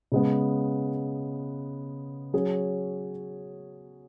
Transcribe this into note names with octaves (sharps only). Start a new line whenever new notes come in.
C#3 G#3 B3
F#3 C#4 G#4